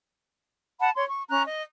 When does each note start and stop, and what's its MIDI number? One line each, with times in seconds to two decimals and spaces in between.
0.81 0.90 78
0.81 0.90 81
0.81 0.90 83
0.96 1.05 73
0.96 1.05 84
1.09 1.23 85
1.30 1.42 61
1.30 1.42 82
1.30 1.42 90
1.45 1.63 75